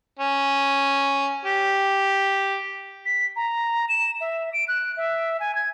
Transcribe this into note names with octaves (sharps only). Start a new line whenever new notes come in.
C#4
G4
B6
A#5
E7
E5
D7
F#6
E5
G#5
G#6